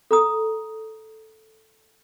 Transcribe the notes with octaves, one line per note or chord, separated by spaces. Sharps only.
A4 A#5 D#6